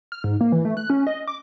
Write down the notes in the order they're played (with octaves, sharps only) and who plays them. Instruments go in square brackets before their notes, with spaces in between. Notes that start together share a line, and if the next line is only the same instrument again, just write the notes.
[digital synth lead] F6
G#2
A#3
E3
A3
F#6
C#4
D#5
D6